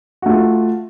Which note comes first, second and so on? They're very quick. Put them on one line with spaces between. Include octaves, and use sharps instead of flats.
F#4 A3 F4